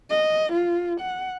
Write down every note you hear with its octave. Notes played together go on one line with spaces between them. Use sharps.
D#5
F4
F#5